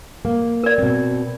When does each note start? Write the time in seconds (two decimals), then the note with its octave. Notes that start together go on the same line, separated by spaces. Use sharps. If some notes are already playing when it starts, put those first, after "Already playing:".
0.25 A#3
0.64 A#4 D5
0.78 B2 C4